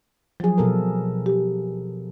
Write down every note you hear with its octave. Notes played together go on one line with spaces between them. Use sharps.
F3 F#3 G#4
B2 A4 A#4
G4